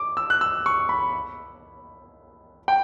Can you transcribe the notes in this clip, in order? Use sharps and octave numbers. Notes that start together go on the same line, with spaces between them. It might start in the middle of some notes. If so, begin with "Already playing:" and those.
Already playing: D6
E6
F#6
E6
C#6
B5
G5